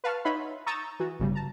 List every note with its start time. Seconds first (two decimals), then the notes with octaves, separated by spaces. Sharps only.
0.04 B4 F5 A5 C#6 F6
0.24 D#4 C#5 E5 F#5 B5 C6
0.66 A#5 C#6 D#6 E6 G6 A6
0.99 E3 F#4
1.20 G1 C#3 G3
1.35 A5 A#5